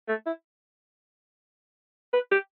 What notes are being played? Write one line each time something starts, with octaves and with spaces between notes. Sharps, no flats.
A3
E4
B4
G4